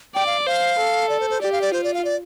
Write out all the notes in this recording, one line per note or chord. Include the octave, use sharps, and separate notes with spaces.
D5 G5
F5
C5 F5
A4
D5
C5
C5
G4 D5
F5
D5
F4 C5
D5
F5
D5